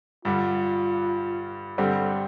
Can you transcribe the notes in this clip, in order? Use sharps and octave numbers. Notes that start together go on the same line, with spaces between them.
G2 D3 G3 F4
G2 D3 G3 C4 G4 A4